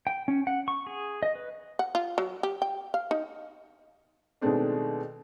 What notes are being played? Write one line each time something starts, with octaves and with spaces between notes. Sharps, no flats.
G5
C#4
F#5
C#6
G#4
D#5
B4
F#5
F4
F#3
G4
G5
F5
D#4
B2 D#3 G#3 A3 C4 D4